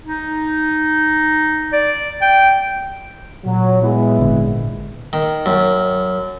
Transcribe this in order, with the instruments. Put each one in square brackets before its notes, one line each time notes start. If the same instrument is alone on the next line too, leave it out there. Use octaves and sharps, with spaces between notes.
[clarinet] D#4
D5
G5
[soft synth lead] A#2 [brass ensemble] F#3
[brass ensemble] G#3 B3 E4
[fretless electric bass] G#1 D3
[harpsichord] D#3
F#2